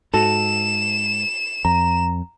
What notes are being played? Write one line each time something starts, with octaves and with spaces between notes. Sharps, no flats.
G#2 F#4 A4 E7
F2 A#5